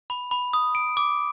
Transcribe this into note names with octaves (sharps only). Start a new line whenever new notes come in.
B5
B5
D#6
D7
D6